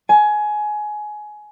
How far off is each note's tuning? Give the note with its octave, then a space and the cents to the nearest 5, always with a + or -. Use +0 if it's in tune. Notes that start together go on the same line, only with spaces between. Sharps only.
G#5 +20